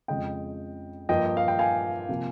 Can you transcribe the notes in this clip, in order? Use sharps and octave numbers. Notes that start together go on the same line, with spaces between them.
F2 C#3 G#3 D#5 G5
G2 F3 A#3 D#5 G5
D#5
F5
G5
F5 G#5
C3 F3 A#3